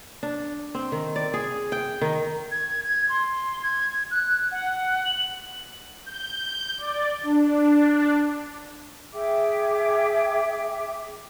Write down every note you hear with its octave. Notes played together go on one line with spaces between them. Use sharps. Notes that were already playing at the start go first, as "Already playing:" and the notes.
D4
C4
D#3
D5
G#4
G5
D#3
G#6
G#6
C6
G#6
F#6
F#5
F#7
G6
D5
D4
G#4 E5 G5 D6